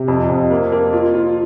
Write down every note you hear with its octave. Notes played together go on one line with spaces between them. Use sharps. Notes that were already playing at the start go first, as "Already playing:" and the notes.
Already playing: C3
F2
F2
A#3
A#3
F4
F4